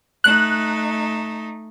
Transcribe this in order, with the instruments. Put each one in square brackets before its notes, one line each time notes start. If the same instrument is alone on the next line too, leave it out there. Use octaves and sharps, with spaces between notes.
[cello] A3 D#4 [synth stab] F#6